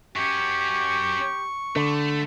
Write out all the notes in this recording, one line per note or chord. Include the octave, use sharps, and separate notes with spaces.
F#2 C#4 G4 C#6
D3 A3